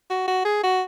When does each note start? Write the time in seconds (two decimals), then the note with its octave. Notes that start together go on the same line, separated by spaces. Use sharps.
0.10 F#4
0.28 F#4
0.45 G#4
0.63 F#4